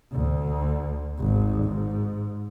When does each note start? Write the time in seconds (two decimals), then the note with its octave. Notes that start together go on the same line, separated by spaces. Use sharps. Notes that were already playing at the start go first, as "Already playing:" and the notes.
0.12 D2
1.18 G#1
1.64 G#2